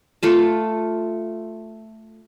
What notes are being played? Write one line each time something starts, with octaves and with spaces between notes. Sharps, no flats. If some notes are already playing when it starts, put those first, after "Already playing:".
A3 F4 A5